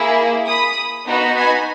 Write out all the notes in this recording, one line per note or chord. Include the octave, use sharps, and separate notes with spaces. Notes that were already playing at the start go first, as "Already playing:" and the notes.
Already playing: A#3 E4 G#4
B5 D#6
B3 D#4 F#4
G#5 B5